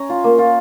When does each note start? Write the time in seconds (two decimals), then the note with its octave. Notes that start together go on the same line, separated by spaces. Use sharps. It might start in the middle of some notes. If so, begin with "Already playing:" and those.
Already playing: C#4 G#5 A#5
0.09 F4
0.24 A#3
0.38 F4